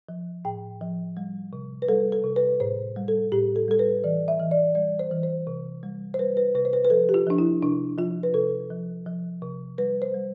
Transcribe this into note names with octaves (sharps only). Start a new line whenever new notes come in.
F3
A2 G5
F3
G3
C3
B4
G3 A4
A4
C3
B4
A2 C5
G3
A4
A2 G4
A4
G3 A4
B4
E3 D5
E5
E3
D5
G3 D5
C5
E3
C5
C3
G3
C5
G3 B4
B4
C3 B4
C5
B4
B4
F3 A4
G4
F4
F3 D4
E4
C3 D4
F3 F4
B4
C3 A4
F3
F3
C3
G3 B4
C5
G3